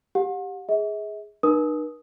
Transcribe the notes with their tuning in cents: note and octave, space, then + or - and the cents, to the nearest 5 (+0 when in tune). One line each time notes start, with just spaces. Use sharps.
G4 +0 F#5 -35
G#4 +0 E5 -45
D#4 -45 B4 -45 D#6 +0